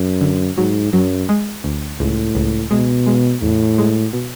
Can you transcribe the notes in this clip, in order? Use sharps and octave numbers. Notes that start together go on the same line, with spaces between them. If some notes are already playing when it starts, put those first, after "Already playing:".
Already playing: F#2
D3
G#2 F#3
F#2 F#3
G#3
D2
C#2 A2
C#2
B2 G#3
G#3
E2 A2
G#3
B2